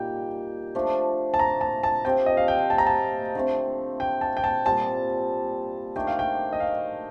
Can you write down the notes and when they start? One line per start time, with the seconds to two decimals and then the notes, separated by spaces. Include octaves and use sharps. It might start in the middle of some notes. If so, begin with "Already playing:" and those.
Already playing: A#2 G3 A#3 D#4 G5
0.75 F3 A3 D4
1.34 A5
1.39 A#5
1.61 A5
1.83 A5
2.05 F3 C4 G4 G5
2.26 D#5
2.37 F5
2.48 G5
2.70 A5
2.78 A#5
2.87 A5
3.35 D3 A3 C4
4.00 G5
4.21 A5
4.37 G5
4.44 A5
4.65 A#2 G3 C4 F4 A5
5.96 D#3 A3 D4 G5
6.07 F5
6.19 G5
6.53 D#5
6.60 F5